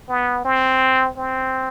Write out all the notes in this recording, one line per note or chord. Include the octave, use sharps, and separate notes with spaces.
B3
C4
C4